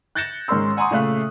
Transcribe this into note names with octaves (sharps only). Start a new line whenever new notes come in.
F#6 G6 A6 A#6 C#7 E7
G#2 D#3 C#4 A#4 C6 E6
F#5 G#5 A#5 C6 C#6 D#6
A#2 C#3 A3 E5 F5 F#6